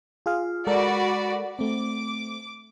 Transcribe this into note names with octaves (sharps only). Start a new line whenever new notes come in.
F4 G#4 F5
G#3 F#4 A4 A#4 D5 B5
A3 C4 D6